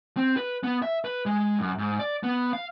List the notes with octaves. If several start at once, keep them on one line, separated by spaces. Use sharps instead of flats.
C4
B4
B3
E5
B4
G#3
F#2
G#2
D5
B3
F5